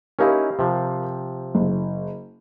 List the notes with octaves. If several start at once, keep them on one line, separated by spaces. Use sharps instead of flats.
C#4 D#4 E4 G4 A#4 F5
C3 F3
F#1